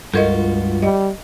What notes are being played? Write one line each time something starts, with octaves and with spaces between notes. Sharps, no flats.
C#2 G2 F4 F#4 A4 A#4 D#5
G3 D#5